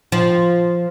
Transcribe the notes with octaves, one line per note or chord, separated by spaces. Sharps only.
F3